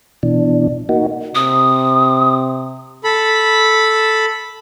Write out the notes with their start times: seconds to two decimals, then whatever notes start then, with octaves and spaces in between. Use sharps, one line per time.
0.23 B2 E3 D4
0.89 A#3 D#4 F#4
1.35 C3 D#6
3.04 A4 B5